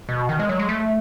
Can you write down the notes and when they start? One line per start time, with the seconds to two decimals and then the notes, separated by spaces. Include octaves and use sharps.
0.09 B2
0.29 D#3
0.39 G#3
0.49 F#3
0.59 G#3
0.69 A3